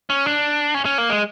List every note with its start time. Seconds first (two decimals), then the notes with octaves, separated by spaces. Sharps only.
0.10 C#4
0.26 D4
0.74 C#4
0.85 C#4
0.98 A#3
1.10 G#3